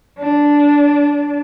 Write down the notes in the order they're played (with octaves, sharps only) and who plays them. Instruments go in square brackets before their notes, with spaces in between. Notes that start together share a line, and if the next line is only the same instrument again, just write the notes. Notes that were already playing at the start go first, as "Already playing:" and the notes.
[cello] D4